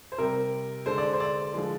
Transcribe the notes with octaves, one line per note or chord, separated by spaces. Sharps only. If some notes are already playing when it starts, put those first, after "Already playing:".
C5
C3 G3 A#4
D3 G#3 C5
D5
C5
D5
D3 F3 G#3